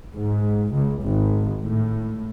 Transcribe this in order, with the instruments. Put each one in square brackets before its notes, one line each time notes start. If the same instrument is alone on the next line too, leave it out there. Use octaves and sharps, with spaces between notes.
[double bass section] G#2
C#2
G#1
A2